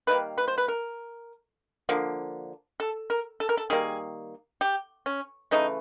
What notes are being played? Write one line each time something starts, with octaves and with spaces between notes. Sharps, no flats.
D#3 G3 A#3 B4
B4
C5
B4
A#4
D3 F3 A#3
A4
A#4
A4
A#4
A4
D#3 G3 A#3 G#4
G4
C#4
C#3 E3 A3 D#4